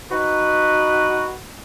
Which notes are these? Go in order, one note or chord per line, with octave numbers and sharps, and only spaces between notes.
D#4 F#4 B4